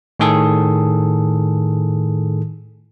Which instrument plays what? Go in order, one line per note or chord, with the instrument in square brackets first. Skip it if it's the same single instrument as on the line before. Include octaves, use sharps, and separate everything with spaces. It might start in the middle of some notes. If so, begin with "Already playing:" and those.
[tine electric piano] A2 D#3 G#4 A4